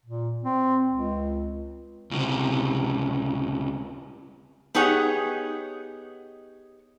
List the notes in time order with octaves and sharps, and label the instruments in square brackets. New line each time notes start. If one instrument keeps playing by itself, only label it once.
[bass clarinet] A#2
C4
C#2
[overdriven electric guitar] C#2 C3
[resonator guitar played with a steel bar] B3 D#4 G4 G#4 C#5 F#5